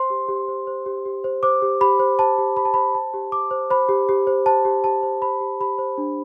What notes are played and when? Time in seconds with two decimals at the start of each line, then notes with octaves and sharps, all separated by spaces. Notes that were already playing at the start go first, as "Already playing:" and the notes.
Already playing: C5 C6
0.10 G4
0.28 G4
0.48 C5
0.67 C5
0.86 G4
1.05 G4
1.24 C5
1.43 C5 D6
1.62 G4
1.81 G4 B5
1.99 C5
2.19 C5 A5
2.38 G4
2.56 G4 B5
2.65 A5
2.74 C5 B5
2.95 C5 A5
3.14 G4
3.32 G4 D6
3.51 C5
3.70 C5 B5
3.89 G4
4.09 G4
4.27 C5
4.46 C5 A5
4.65 G4
4.84 G4 A5
5.03 C5
5.22 C5 B5
5.41 G4
5.60 G4 B5
5.78 C5
5.98 D4